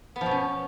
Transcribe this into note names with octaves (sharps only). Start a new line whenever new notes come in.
B3
F3
B2
C#4